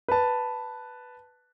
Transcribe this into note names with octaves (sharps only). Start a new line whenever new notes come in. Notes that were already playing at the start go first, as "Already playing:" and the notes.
B4 A5